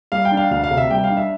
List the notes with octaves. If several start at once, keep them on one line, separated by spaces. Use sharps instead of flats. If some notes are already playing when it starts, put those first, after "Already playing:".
G3 F5
G5
D4
F5
D2 F5
F5
C3
E5
G3 G5
F5
D4
E5